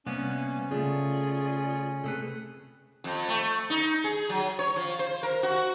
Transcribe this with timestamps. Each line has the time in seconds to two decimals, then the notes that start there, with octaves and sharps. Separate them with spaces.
0.06 C3 G3 A#3 B3 C#4
0.71 C#3 A3 F4 G#4 D5
2.04 C3 A3 G#4 A4 B4
3.04 F2
3.28 A3
3.70 D#4
4.04 G#4
4.29 F#3
4.59 C#5
4.76 F3
4.99 C5
5.23 A#4
5.43 F#4